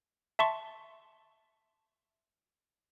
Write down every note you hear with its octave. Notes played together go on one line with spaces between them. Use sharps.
E5 A5 C6 C#6